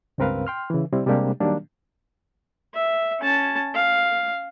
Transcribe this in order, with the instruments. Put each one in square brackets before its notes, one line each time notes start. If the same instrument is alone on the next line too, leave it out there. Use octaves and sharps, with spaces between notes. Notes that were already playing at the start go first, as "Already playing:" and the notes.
[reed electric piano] C#2 G2 C4 A#4 B4 F5
G5 C6 F6
C#3 E3
C3 G3 C4 E4
C3 G3 G#3 A#3 D4 G4
D#3 F#3 G3 A#3 D4
[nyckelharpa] E5
C#4 A5
F5